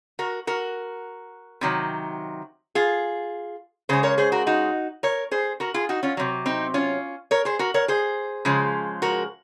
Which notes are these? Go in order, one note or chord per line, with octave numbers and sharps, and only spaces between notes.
F#4 A#4
F#4 A#4
C3 D#3 F#3
F4 G#4
C#3 G#3 G#4 C5
A#4 C#5
G#4 C5
F#4 A#4
D#4 F#4
A#4 C#5
G#4 C5
F#4 A#4
F4 G#4
D#4 F#4
C#4 F4
C3 F#3
C4 D#4
C#4 F4
A#4 C#5
G#4 C5
F#4 A#4
A#4 C#5
G#4 C5
C#3 F3 G#3
F#4 A#4